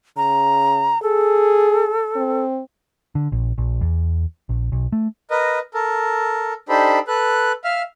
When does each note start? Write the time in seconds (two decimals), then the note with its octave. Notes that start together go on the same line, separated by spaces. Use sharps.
0.17 C#3 A#5
1.02 G#4 A4
2.16 C4
3.15 D3
3.32 A#1
3.58 A#1
3.81 E2
4.49 A#1
4.72 B1
4.92 A3
5.31 A#4 B4 D#5
5.74 A4 A#4
6.69 D4 D#4 G4 A4 C5 B5
7.08 A4 B4 F#6
7.64 E5 F5 F6